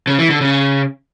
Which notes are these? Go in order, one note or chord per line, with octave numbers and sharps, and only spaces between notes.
C#3
E3
D3
C#3